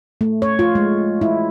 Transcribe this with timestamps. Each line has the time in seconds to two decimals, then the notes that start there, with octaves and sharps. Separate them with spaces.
0.21 A3
0.42 C#5
0.59 F4
0.75 G#3
1.21 E4